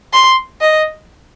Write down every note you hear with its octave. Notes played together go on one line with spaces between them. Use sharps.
C6
D#5